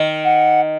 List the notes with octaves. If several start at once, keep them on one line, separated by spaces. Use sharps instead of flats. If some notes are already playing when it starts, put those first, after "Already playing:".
Already playing: D#3
F#5